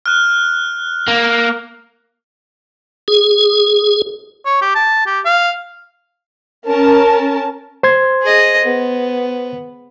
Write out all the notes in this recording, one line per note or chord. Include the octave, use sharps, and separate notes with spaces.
F6 F#6
A#3
G#4
C#5
G4
A5
G4
F5
C#4 A#4 A5
C5 C6 G#6
G#4 D#5
B3